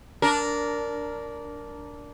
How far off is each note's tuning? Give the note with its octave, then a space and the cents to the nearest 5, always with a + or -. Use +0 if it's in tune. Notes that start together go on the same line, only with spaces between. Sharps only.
D4 -15 A#4 +0